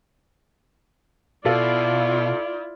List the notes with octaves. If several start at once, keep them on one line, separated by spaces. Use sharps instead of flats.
B2 E4 F4 A4 D5 F5 A6